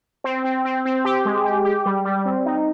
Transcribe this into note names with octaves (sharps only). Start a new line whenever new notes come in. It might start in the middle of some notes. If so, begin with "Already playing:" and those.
C4
C4
C4
C4
G4
G#3
G4
G4
G3
G3
C4
D#4